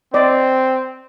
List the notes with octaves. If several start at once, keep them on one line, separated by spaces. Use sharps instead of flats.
C4 D5 D#5